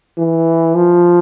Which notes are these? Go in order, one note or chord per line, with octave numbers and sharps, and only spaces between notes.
E3
F3